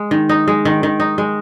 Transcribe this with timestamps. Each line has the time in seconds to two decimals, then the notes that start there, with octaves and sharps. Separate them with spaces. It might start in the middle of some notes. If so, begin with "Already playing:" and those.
Already playing: G#3
0.11 D#3
0.29 D#4
0.48 G#3
0.65 D#3
0.83 D#3
1.00 D#4
1.18 G#3